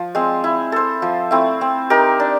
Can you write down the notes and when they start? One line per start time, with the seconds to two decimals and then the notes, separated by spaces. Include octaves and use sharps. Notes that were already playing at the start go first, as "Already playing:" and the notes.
Already playing: F3
0.15 G#3 C4
0.44 E4
0.72 A4 C5
1.02 F3
1.31 A3 C4 E4
1.61 C4
1.90 D#4 G4 A#4
2.20 D4